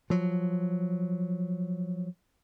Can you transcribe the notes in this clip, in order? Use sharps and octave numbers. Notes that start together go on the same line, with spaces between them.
F3 F#3